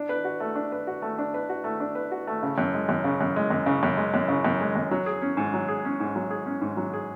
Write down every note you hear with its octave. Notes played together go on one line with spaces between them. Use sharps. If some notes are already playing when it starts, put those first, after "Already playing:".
Already playing: D4
B4
F#4
A3
D4
B4
F#4
A3
D4
B4
F#4
A3
D4
B4
F#4
A3
C#3
F#2
G#3
F#2
C#3
F#2
G#3
F#2
C#3
F#2
G#3
F#2
C#3
F#2
G#3
F#2
F#3
G#4
C#4
G#2
F#3
G#4
C#4
G#2
F#3
G#4
C#4
G#2
F#3
G#4